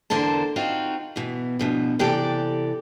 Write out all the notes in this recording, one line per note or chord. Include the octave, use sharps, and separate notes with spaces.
E2 D3 A#4 C5 A5
C4 D#4 F4 F#4
B2 E3
D2 B2 F3
C3 E3 G4 A4 D5 G5